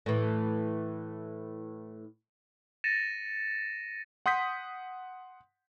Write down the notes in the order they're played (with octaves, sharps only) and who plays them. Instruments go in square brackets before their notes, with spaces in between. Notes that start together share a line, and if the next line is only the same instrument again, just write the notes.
[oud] A2 E3
[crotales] A6 A#6 C#7 D#7 E7
[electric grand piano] F#5 C6 D#6 G6 B6